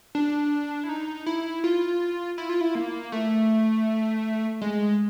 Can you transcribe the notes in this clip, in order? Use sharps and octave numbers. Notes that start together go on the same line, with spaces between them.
D4
E4
D#4
E4
F4
E4
F4
E4
A#3
A3
G#3